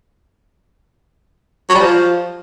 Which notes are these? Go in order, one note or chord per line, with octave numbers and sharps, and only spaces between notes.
F#3
G3
F3